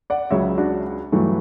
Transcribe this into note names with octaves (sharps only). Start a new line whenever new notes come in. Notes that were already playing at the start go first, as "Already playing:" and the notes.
D5 F#5
C#2 C#3 F#3 C#5 E5
D4 F#4
G2 E3 F#3 A3